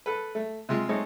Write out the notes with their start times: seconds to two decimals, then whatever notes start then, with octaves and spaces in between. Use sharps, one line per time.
0.06 A4 B4
0.35 A3
0.69 C3 G#3 F4
0.89 G#3 A3 C4 D#4 A4 C#5